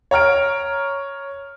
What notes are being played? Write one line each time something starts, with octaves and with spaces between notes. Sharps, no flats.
C#5 A#5 F6 D7